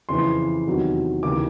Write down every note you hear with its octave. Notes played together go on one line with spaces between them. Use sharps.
F2 C#3 E3 C6
E2 C3 D#3 F#3
D#2 C#3 E3 D6